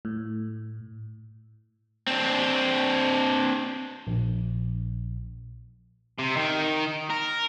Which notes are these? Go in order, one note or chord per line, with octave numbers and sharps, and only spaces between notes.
A2
C4 D4
A#1
C3
D#3
A#4